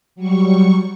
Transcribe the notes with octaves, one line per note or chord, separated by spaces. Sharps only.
F#3 G3 C#6